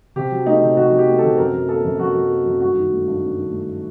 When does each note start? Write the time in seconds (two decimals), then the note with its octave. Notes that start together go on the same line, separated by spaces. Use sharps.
0.16 C3 G4
0.31 F#3
0.46 A3 D#4
0.62 C3
0.77 C3 F#4
0.92 F#3
0.98 G4
1.08 A3
1.18 C3 A4
1.38 F#2 A#4
1.54 F#3
1.69 A#3 A4
1.84 F#2
1.99 F#2 F#4
2.15 F#3
2.30 A#3
2.46 F#2
2.60 G2 F#4
2.76 D#3
2.91 A3
3.07 G2
3.22 G2
3.37 D#3
3.52 A3